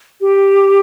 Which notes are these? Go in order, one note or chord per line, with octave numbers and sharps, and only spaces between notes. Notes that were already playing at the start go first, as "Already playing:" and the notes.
G4